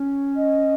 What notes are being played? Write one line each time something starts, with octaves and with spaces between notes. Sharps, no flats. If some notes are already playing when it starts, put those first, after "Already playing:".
Already playing: C#4
D#5